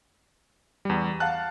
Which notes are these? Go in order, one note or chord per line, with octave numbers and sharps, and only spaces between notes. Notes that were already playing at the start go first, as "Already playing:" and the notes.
E2 G3
F5 F#5 A5 F#6